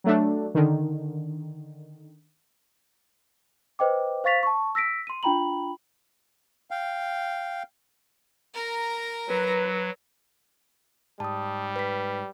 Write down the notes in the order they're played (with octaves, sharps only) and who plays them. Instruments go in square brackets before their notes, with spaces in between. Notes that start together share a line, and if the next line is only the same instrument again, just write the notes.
[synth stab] F#3 A3 D4
D3 D#3
[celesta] B4 C5 D#5 G5 D6
C5 F5 C#6 A6 B6 F7
A5 C#6
E6 A#6 B6 D7
C6 D#7
D4 F4 G5 A#5 B5 F#7
[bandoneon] F5 G5
[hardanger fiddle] A#4 A#5
[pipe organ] F#3 [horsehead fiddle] B4
[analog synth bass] G#2 [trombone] G3 [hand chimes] A5 D#6
[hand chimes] B4 B6